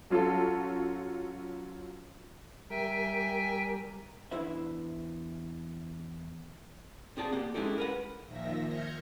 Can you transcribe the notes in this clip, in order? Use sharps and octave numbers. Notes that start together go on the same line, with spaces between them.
F#3 C#4 F4 F#4 A4
G3 A#4 E5 G5 G#5
E2 D4 E4 B4 C5 E5
C4 G#4 D5 A5
A#3 G4 F#5
G#3 C#4 D#4 E4 G4 A4
A#4 B4 F#5
A#2 D#3 F3 E5 A#6
F6 G6 G#6 A#6 C#7